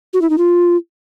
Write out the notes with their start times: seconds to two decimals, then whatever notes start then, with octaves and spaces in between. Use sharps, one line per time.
0.14 F#4
0.22 E4
0.30 D#4
0.38 F4